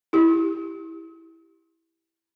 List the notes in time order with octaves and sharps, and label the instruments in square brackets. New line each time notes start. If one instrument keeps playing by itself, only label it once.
[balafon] E4 G4